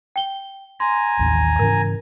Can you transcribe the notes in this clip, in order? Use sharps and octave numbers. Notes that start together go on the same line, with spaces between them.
G5 G7
G#5 A#5 C6
A1 D#2 D#3
G#2 C#3 E3 A#4